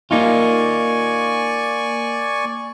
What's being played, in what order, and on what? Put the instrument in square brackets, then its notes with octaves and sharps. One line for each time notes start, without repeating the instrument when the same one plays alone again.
[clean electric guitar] A#3 D#4 F4 [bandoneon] D5 G#5 C#6